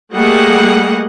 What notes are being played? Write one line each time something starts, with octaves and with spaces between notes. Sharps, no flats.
G3 A3 A#3 G#4 D#5 F#5